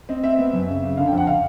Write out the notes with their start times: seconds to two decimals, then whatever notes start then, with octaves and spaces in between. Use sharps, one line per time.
0.09 C4 D#5
0.23 C4 E5
0.39 B3
0.53 F#2
0.68 C#3
0.83 C#3
0.97 D3 F5
1.08 G5
1.13 F2 F#5
1.27 F5